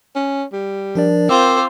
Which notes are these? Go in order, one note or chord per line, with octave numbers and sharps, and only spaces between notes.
C#4
G3
F3 D4 A#4 D5
C4 F4 C5 D6 E6